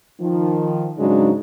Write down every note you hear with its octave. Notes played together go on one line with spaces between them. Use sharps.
D#3 F3
G#2 C#3 F#3 G#3 D4 D#4